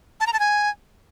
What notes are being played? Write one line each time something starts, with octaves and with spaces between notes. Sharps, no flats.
A5
A#5
A5
G#5